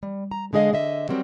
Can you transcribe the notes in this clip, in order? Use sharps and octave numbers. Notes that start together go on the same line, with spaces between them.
G3
A#5
D3 G#3 G#4 D#5 F5
D3 D#5 E5
F#3 G3 C4 A#4